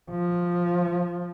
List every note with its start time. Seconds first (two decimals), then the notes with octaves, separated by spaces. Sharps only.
0.11 F3